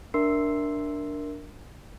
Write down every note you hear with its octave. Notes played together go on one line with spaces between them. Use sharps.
D4 A#4 E5 C6 E6 C7